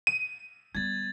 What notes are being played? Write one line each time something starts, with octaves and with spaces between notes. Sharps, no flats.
D#7
G3 B3 G#6 A6